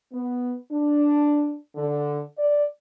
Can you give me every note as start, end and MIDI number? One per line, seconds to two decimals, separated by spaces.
0.13 0.55 59
0.71 1.56 62
1.75 2.21 50
2.38 2.63 74